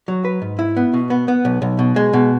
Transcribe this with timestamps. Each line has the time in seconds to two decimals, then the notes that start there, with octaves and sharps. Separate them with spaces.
0.08 F#3
0.25 B4
0.42 G#2
0.59 E4
0.77 B3
0.94 B2
1.10 B3
1.28 B3
1.45 B1
1.62 B1
1.79 B2
1.96 G#3
2.13 B2